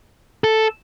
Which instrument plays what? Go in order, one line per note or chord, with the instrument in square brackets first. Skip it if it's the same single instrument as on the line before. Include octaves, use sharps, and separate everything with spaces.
[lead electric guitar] A4